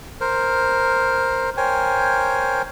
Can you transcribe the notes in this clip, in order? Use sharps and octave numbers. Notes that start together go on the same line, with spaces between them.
A#4 C5
A#4 C5 C#5 G5 G#5